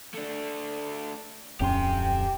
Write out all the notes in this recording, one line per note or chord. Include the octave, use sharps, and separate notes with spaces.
A3 D4
D1 F2 C#4 G4 G5 C6